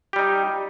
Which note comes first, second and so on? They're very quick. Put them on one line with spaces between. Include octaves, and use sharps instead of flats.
G4 G3 D#4